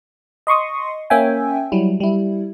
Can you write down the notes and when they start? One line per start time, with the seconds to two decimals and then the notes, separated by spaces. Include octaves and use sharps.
0.47 D#5 C6 C#6 D#6
1.10 A#3 C#4 E5 G5 G#5
1.72 F#3 G3 E4
2.00 G3 E4